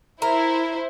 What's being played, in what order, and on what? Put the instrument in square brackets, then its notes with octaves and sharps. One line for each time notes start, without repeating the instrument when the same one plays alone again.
[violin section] E4 C5 [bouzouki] A#4